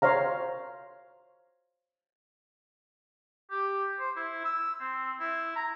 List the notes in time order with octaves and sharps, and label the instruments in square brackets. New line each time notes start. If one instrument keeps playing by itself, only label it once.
[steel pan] C5 C#5 F5 A#5
[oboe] G4
C5
E4
E6
C4
E4
A#5